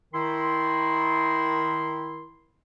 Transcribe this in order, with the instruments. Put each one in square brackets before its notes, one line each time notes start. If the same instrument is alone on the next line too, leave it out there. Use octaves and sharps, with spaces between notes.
[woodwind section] D#3 E4 C6